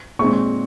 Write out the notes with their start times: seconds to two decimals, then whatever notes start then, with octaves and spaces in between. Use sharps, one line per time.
0.19 A#2 G#3 C4 C#6